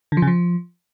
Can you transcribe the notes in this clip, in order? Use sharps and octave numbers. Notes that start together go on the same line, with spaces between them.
D3
F3
C#3
F3